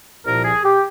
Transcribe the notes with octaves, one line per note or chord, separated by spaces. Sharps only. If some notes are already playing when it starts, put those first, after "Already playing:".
C2 A#2 F3 A#4
G#4
G4